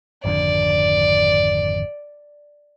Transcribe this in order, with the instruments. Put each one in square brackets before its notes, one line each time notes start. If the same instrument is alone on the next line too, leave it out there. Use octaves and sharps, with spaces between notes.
[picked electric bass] G#1 F2 D3 [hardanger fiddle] D5